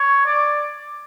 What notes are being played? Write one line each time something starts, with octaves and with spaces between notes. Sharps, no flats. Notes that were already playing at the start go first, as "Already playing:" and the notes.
Already playing: C#5
D5